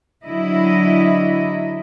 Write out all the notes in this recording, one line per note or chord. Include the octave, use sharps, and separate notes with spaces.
D3 F#3 E4 D#5